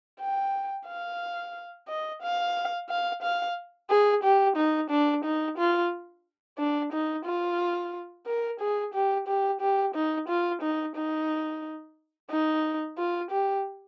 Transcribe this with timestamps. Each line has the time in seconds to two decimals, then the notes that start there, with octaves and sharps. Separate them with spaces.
0.20 G5
0.87 F5
1.89 D#5
2.22 F5
2.89 F5
3.22 F5
3.90 G#4
4.23 G4
4.56 D#4
4.90 D4
5.24 D#4
5.58 F4
6.58 D4
6.92 D#4
7.25 F4
8.27 A#4
8.60 G#4
8.94 G4
9.27 G4
9.61 G4
9.94 D#4
10.28 F4
10.62 D#4
10.96 D#4
12.30 D#4
12.98 F4
13.31 G4